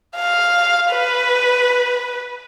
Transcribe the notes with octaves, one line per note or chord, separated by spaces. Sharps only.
F5
B4